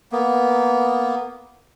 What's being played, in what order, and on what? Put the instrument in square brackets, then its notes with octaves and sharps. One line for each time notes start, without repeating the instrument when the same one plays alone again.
[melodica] A#3 B3